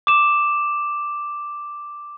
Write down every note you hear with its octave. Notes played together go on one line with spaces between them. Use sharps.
D6 E7